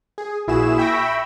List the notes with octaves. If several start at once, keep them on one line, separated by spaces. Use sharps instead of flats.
G#4
A#1 A#2 E4 F#4 G#4 E7
E5 G5 B5 C#6 E6 A#6